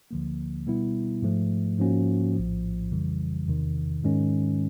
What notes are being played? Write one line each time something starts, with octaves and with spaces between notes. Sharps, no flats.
D2 D3 F3 A#3
B2 G3 B3 E4
G#2 F3 A3
G#2 F3 A#3 C#4 F#4
A#1 A2 F3
F2 C#3 E3 G3
E2 C3 D#3
G#2 D#3 G#3 C#4